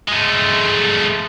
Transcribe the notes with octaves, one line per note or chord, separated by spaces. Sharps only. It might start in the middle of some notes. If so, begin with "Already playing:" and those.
G#3 A3